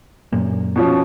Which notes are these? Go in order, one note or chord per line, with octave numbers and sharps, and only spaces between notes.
F#2 A#2
B2 F3 C#4